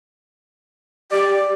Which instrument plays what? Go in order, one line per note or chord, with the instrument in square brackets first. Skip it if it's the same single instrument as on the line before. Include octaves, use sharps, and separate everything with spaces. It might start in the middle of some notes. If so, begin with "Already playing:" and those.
[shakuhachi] G4 [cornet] D5